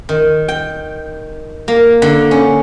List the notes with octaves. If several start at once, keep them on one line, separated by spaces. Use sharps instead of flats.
D#3
G5
A#3
D3
C#4